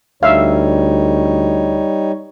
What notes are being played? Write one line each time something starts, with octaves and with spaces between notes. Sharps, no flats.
D2 G3 D#4 C#5 E5 F5